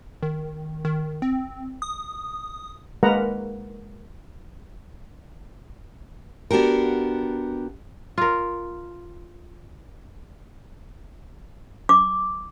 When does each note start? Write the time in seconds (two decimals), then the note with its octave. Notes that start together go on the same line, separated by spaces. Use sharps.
0.23 D#3
0.85 D#3
1.22 C4
1.82 D#6
3.03 G#3 A#3 A#4 B4 F#5 A#5
6.51 B3 D4 F#4 G4 A#4
8.18 F4 A#4
11.89 D6